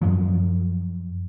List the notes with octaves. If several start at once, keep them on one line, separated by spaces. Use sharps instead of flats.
F#2 F3 F#3